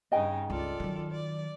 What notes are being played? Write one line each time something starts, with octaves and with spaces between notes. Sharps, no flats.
G2 C#3 D#4 D#5 G5 G#5
C#2 F4 A4 D5
D#3 F#3
D5